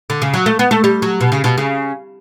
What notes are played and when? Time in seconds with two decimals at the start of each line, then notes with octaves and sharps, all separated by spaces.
0.10 D3
0.22 C#3
0.34 F#3
0.46 A3
0.59 B3
0.71 A3
0.84 G3
1.02 F#3
1.21 B2
1.32 C#3
1.44 B2
1.58 C#3